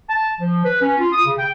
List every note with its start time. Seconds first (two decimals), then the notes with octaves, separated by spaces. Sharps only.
0.09 A5
0.39 F3
0.64 B4
0.81 C#4
0.98 F4
1.12 D#6
1.25 C#3
1.38 G5